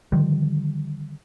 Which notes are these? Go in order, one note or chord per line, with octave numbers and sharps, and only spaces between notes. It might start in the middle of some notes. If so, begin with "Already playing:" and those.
D3 D#3 F3 G3